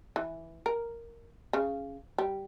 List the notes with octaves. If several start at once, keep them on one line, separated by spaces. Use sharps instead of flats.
E3
A#4
C#3
G3